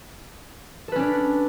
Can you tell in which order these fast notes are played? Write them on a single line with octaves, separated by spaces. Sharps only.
A4 B4 C#4 D4